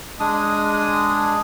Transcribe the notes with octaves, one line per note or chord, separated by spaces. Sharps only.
G#3 D4 D#6